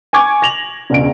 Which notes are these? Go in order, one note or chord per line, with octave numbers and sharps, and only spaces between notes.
G#5 C#6 D6 G#6
A#6 F7 F#7
E1 C#2 D7